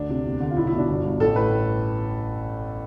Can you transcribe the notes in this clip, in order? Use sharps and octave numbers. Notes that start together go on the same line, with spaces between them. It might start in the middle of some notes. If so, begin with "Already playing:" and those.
Already playing: D2 D4
C3
E2
D3
F4
B1 E4
E4
B2
D4
G1
G2
A1 A4
A2 B4